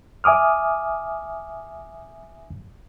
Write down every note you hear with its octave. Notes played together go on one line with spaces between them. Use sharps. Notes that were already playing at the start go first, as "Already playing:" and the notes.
E5 G#5 D6 D#6 F6